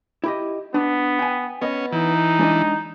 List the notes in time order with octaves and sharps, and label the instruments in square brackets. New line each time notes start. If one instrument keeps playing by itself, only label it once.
[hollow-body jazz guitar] E4 G4 D#5
[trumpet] B3 [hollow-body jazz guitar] D4
[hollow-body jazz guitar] G5 G#5
[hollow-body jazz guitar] B3 D#5 [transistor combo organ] C#4
[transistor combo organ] E3 [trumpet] D#4
[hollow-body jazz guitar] G#3 D4 D#5